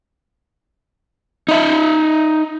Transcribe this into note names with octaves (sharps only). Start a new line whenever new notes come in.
D#4 E5